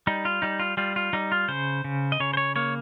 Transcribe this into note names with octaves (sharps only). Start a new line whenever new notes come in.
G3 D#4
F4
G3 D#4
F4
G3 F4
F4
G3 D#4
F4
C#3 C5
C#3
D#5
C#3 C#5
C5
C#5
A#3 C#5